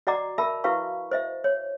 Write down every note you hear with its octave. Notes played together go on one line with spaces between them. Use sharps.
F#4 D5 D#5 F#5 A#5 D6
A#4 E5 A5 B5
E4 F#4 B4 F5 C#6
C5 D#5 E5
C#5